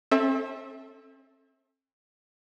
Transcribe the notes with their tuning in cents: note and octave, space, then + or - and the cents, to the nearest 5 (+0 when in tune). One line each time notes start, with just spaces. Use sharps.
C4 +40 A4 +0 E5 -20